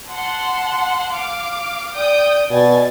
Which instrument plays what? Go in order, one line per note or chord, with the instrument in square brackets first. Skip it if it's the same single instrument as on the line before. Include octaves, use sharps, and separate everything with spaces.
[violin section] F#5 A5 C6
F5 D6
[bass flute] D5 [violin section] G5 D#6 G6
[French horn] B2 [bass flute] D5 [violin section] G#5 A6